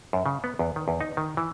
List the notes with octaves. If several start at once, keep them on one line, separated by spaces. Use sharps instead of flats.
F#2
C#3
B3
E2
D#3
E2
D#4
D#3
E3